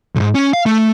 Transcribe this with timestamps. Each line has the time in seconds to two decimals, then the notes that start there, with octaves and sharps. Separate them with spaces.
0.16 B1 G#2
0.35 C#4
0.53 F5
0.66 A3